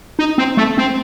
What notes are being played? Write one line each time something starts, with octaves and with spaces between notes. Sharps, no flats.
D#4
C4
A3
C4